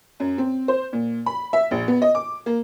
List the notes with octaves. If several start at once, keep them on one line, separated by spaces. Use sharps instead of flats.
F#2
C4
C5
A#2
B5
E5
A#1
B3
D#5
D6
A#3